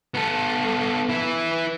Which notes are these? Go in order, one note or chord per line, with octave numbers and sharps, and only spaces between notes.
B3 A4
E4 B4